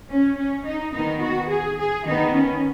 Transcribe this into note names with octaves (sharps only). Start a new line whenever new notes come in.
C#4
C#4
D#4
D#3 B3 D#4
F#4
G#4
G#4
D#3 B3 D#4
C#4